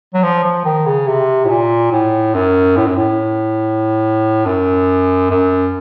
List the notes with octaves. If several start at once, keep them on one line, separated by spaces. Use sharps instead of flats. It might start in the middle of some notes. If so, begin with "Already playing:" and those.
F#3
F3
F3
D#3
C#3
C3
A2
A#2
A2
F#2
A2
F#2
A2
F#2
F#2